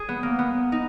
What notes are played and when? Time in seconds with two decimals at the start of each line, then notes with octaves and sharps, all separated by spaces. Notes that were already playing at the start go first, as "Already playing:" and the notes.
Already playing: G#4
0.09 B3
0.23 A#3
0.39 B3
0.72 D#4